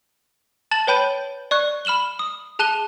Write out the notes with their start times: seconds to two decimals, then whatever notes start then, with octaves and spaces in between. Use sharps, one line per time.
0.71 A5 A6 E7 F#7
0.87 B4 C#5 G5 B5 G6 D#7
1.51 D5 C#6 F#6
1.85 B5 F6 E7 F#7 G7
2.19 D#6
2.59 G#4 A5 F#6 D#7 G7